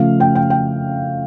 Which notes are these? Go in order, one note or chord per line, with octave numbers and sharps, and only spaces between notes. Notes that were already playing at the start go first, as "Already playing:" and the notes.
Already playing: C#3 F3 A3 F5
G5
G5
G5